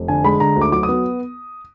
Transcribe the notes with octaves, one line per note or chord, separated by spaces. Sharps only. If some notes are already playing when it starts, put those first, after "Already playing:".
Already playing: F1
D3 G#5
G#3 B5
D3 A#5
D2
D6
F#3 D6
D#6
B3